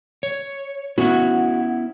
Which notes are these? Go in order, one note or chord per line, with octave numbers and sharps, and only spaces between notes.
C#5
B3 C#4 E4 F#4